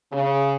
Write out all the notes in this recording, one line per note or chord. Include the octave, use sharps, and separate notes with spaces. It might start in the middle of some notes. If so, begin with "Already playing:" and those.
C#3